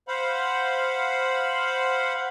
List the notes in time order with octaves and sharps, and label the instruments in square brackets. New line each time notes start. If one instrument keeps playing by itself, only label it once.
[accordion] C5 F5 F#5 B5